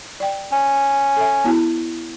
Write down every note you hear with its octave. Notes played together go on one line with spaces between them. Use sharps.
D5 G5
C#4
A4 E5
B3 E4 F#4